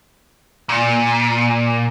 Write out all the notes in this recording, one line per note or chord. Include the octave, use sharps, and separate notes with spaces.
A#2